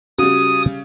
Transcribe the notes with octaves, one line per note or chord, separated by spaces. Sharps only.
C#3 G3 F#4 D#6